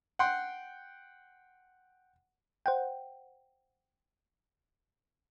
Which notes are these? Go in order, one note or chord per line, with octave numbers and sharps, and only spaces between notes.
F#5 G5 C6
C5 F#5 G5